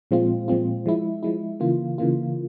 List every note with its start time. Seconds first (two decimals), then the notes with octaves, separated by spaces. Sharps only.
0.11 A#2 F3 G#3 C4 F4
0.48 A#2 F3 G#3 C4 F4
0.86 F3 G#3 E4
1.23 F3 G#3 E4
1.60 C#3 E3 A#3 F4
1.98 C#3 E3 A#3 F4